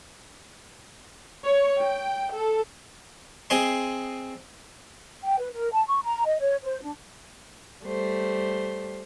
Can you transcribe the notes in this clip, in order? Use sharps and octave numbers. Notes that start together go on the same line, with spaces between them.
C#5
G5
A4
C4 G#4 D#5 C6
G5
B4
A#4
A5
C#6
A#5
D#5
C#5
C5
D4
G3 A3 C5